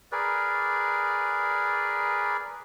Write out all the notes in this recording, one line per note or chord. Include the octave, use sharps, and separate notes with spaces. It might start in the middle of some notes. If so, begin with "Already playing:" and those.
G#4 A#4 B4 D5